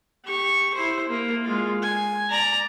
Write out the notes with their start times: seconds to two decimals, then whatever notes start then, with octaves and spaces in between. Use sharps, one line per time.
0.25 G4 C#6
0.74 E4 C5
1.09 A#3
1.44 G#3 F4
1.82 G#5
2.31 D5 A#5